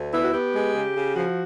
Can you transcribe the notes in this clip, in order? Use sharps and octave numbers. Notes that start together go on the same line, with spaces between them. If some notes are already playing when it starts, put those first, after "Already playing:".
Already playing: D2
B3 E4
F#4
B3 G4
G#3
C#3
C#3
F3 F#4